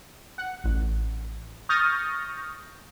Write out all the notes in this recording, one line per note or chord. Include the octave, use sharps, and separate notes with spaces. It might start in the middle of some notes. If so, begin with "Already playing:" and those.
F#5
A1
C#6 D#6 F6 G6 A6 A#6